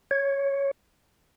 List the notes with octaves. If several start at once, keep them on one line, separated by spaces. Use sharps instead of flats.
C#5